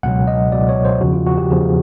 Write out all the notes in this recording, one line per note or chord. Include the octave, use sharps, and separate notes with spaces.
C#2 B2 F#3 F#5
D#5
C#2 B2 F#3 D5
C#5
C5
E2 C#3 F3 F#4
F4
F#4
G4
E2 C#3 F3 G#4